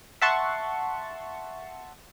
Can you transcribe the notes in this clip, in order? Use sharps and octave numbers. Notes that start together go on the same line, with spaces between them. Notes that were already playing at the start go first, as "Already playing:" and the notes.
E5 F#5 A5 C6 C#6